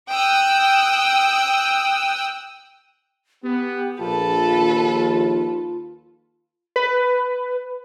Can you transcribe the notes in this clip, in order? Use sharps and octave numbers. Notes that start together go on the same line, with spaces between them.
G5 D#6 E6 F#6
B3 G4
A#1 F4 A4 B4 A5
D#2
B4